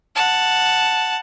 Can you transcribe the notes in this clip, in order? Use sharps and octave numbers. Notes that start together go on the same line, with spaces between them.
F#5 A5